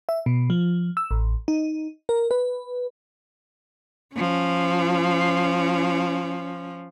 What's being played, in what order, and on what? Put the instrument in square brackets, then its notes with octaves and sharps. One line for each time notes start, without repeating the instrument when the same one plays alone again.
[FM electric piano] E5
B2
F3
E6
A1
D#4
A#4
B4
[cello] F3 C#4